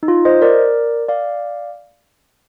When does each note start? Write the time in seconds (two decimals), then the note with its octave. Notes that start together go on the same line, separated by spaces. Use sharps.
0.03 D#4
0.08 F4
0.25 C5 D#5
0.42 A#4 D5
1.08 D5 F5